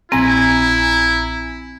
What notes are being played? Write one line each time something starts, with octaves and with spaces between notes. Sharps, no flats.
A#1 C4 E4 G#5 A#5